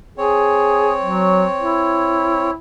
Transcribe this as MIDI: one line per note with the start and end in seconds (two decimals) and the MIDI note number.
0.18 2.51 60
0.18 0.92 68
0.18 2.51 73
1.03 1.44 54
1.61 2.55 64